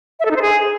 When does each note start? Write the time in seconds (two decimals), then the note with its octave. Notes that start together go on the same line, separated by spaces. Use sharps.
0.20 E5
0.25 A4
0.31 D#4
0.36 C5
0.42 G#4